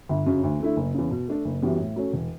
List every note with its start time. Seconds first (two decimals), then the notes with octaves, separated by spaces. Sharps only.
0.09 G1
0.26 F#2 C#3
0.43 D2
0.60 D3 A3 E4
0.77 F#1
0.94 E2 C#3
1.11 B2
1.28 A3 D4 A4
1.45 F#1
1.62 F#2 E3 G3 B3
1.79 A2
1.96 F#3 A3 C#4
2.13 E1